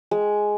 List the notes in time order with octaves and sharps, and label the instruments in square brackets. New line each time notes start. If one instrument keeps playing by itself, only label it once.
[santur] G#3